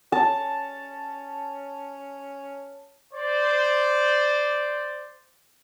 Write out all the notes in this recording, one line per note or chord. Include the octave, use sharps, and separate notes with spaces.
C#4 A5
C5 D5